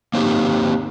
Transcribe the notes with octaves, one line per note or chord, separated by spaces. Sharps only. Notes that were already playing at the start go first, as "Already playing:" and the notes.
A#3 C4 D#4 G4